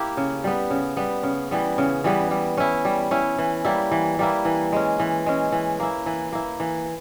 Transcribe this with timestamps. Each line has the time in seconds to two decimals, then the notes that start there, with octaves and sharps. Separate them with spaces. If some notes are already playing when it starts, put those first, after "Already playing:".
Already playing: A#3 E4 G4
0.17 C#3
0.44 G3 B3
0.70 C#3
0.97 G3 B3
1.23 C#3
1.51 E3 G3 B3
1.78 C#3
2.04 E3 G3 B3
2.31 G3
2.57 C#4 E4
2.85 G3
3.11 C#4 E4
3.38 E3
3.64 G3 A#3 E4
3.91 E3
4.19 G3 A#3 E4
4.45 E3
4.72 G#3 C#4
5.00 E3
5.26 G#3 C#4
5.52 E3
5.80 A#3 E4
6.06 E3
6.32 A#3 E4
6.60 E3